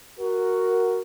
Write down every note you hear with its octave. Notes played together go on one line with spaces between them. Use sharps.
F#4 A#4